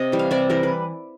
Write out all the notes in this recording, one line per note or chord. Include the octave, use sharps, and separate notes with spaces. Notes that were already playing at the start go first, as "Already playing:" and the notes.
Already playing: C3 D#5
E3 G3
F5
C3 D5 E5
E3 G3 A#4
B4